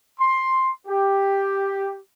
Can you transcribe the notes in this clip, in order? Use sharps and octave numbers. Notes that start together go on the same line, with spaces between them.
C6
G4